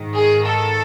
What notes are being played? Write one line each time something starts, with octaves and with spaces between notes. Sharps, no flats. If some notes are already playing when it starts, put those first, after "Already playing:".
Already playing: G#2 D#3
G#4
A4